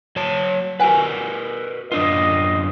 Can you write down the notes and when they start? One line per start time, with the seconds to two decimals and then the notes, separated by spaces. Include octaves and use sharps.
0.16 F#3 C#5 A5
0.80 F#4 A#4 B4 F#5 G#5
1.92 F#2 D4 F4 A#4 D#5